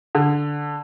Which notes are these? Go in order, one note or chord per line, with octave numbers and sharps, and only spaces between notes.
D3